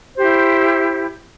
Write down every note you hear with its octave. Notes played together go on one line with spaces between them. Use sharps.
E4 G4 C5